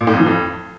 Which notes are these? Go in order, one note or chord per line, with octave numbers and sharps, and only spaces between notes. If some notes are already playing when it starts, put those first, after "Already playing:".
A#2
A2
F2
E3
F2